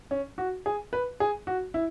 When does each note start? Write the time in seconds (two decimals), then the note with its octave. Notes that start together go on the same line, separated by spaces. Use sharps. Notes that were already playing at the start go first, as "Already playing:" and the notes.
0.11 C#4
0.38 F#4
0.66 G#4
0.93 B4
1.20 G#4
1.47 F#4
1.74 E4